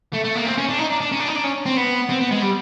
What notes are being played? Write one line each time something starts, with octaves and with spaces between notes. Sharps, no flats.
A3
A3
A#3
C4
C#4
D4
D#4
D4
D4
C#4
D4
D#4
D4
C#4
C4
B3
C4
B3
G#3
G3